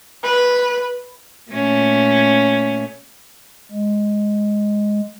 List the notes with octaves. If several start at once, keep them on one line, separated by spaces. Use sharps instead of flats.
B4
A#2 A3 C#4
G#3